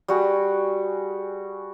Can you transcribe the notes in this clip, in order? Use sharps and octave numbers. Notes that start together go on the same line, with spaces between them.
G3 F#4 G#4